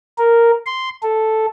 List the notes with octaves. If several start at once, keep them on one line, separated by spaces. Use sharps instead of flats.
A#4
C6
A4